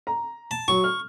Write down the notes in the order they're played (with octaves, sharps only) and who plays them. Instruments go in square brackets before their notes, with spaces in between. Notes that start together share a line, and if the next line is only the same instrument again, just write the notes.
[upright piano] A#5
[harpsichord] A5
[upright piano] F#3 [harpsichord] C#6
[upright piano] F6